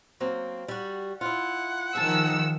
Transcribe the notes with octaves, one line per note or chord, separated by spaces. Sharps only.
F#3 A#3 C4
G3 F#4
E4 F4 F#5
D#3 F3 G#4 A5 E6